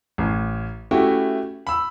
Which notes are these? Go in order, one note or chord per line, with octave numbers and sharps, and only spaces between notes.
A1
A3 C#4 E4 F#4 G4
B5 E6